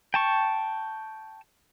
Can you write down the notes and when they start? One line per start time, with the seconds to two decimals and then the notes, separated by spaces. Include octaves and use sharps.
0.14 G5 A5 C#6